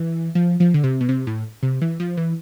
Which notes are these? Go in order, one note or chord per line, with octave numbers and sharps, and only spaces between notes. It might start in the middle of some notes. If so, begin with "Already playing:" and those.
Already playing: E3
F3
F3
D3
C3
B2
C3
A2
C3
E3
F3
E3